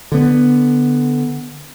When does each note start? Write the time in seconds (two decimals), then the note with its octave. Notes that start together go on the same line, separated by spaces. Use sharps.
0.12 D3 B3